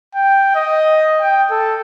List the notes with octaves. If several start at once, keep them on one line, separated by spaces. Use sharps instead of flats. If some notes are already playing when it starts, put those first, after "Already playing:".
G5
D#5
G5
A4